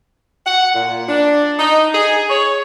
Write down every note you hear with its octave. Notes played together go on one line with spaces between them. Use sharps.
F#5
A#2
D4
D#4
G#4
C#5